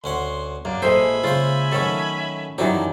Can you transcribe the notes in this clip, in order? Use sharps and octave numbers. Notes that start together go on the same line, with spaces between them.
D2 C#4 F#5 C6
F#2 A#3 D4
A#1 G#3 A4 C5 E5 G#5 B5
C#3 F4 C5
D#3 F#3 A3 C#4 A4
F#2 D#3 E3 F#3 D4 G4